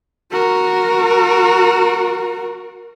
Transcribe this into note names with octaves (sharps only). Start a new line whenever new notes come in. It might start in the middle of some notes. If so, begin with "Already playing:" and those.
F#4 A#4